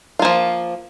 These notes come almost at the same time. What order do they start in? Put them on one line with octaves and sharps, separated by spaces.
F4 A#3 F3